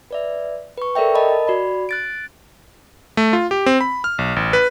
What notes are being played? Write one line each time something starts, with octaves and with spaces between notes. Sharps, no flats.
B4 D5 E5
B4 C#6
A4 A#4 D5 E5 G5
A#4 D#5 A5 B5
F#4 D5 B5
F#6 A6 D7
A3
F4
G4
C4
B5
F6
B1
A1
B4